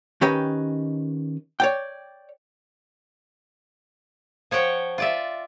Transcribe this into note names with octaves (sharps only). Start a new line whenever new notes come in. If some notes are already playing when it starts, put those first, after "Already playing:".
D#3 C#4 G4 B4 D#5 G5
C#5 D5 G5
F3 C#5 F#5 G5
F4 D5 E5